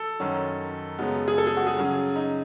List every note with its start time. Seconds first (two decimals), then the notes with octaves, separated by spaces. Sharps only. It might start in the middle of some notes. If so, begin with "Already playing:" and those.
Already playing: A4
0.20 F#2 D#3 F#3 C#4
0.99 F#2 C#3 G#3 B3
1.28 G#4
1.38 A4
1.47 G#4
1.57 F#4
1.67 G#4
1.77 C#3 F#3 C#4
2.16 D#4